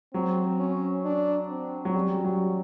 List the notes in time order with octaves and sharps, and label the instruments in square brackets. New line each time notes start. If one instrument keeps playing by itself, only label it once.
[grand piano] F#3 [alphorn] C4
[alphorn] C#4
D4
C4
[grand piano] F#3
[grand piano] G3 [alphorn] C#4
[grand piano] F#3